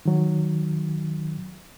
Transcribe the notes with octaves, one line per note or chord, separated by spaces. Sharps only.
D#3 F#3